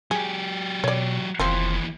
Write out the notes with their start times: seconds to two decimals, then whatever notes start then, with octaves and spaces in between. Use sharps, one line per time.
0.11 F#3 G4 G#4
0.84 B2 C#5 D5
1.40 F1 D#2 E3 F3 C4